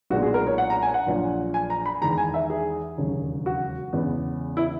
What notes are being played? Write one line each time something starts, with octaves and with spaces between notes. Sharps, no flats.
B1 A#2 G#3 B3 F#4
G#4
A#4
C#5
F#5
A#5
G#5
F#5
A#1 A#2 F#3
G#5
A#5
B5
E2 D#3 G#3 A#5
G#5
E5
G#4
E1 D#2 C#3 F#3
F#4
E2 C#3 G#3 B3
E4